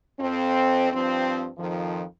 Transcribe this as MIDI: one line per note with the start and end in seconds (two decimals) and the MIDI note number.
0.19 0.90 41
0.19 0.90 60
0.92 1.48 43
0.92 1.48 53
0.92 1.48 60
1.58 2.02 41
1.58 2.02 51
1.58 2.02 53